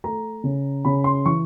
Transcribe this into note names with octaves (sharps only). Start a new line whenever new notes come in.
A3 A#5
C#3
C#3 B5
C6
E3 C#6